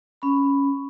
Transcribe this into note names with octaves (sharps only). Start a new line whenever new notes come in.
C#4 B5